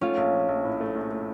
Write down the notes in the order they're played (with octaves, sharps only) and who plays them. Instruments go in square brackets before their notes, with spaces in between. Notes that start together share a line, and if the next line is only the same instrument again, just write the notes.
[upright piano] A3 [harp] C#4 F4
[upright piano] A#1
F3
A#1
A2
A3
A#1
A3